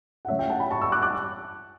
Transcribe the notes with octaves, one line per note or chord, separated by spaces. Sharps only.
F#5
E3 A3 C#4 C#5 E5
E5 G5
F#5 A5
G5 B5
A5 C#6
C#6 E6
D6 F#6
D6 F#6